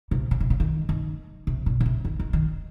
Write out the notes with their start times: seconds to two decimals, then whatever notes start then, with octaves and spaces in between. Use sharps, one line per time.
0.11 C3
0.31 C#3
0.40 C3
0.50 C#3
0.60 D#3
0.89 D#3
1.47 C3
1.66 A#2
1.80 C#3
1.86 C3
2.05 D#3
2.19 D#3
2.33 D#3